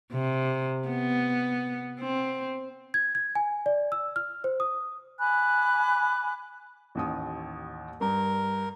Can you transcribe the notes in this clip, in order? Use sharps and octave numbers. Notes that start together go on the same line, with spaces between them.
C3
B3
C4
G#6
G#6
G#5
D5
E6
F6
C5
D#6
G#5 B5 D6 F#6
A1 D#2 D#6
G2 A#4